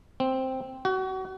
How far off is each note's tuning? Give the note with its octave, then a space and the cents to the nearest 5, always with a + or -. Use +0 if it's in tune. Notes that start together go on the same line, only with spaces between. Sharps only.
C4 +0
F#4 +30